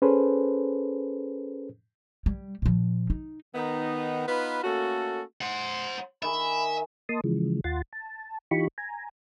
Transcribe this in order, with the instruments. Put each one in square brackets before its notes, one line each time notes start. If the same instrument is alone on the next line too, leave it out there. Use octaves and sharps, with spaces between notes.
[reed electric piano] C#4 G#4 A4 B4 C5
[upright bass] G3
A#2 F3
D#4
[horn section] D#3 B3 D#4
B3 D#4 F4 B4
A3 A#3 C#4 F#4 A4
[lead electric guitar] C5 F#5
[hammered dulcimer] D#3 G#4 [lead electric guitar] E5 [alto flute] B5
[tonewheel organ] A#3 D#5 A5 C6 D#6
C#3 E3 F3 G#3
D#2 F4 F#5 C6 A6
A5
E3 D#4 F4 G4 B5 C#6
G#5 A#5